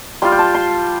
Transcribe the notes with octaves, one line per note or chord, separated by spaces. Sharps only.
G3 F4 C6
G5
A5
C6